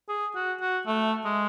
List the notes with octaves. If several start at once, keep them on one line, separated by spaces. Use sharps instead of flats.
G#4
F#4
F#4
A3
G#3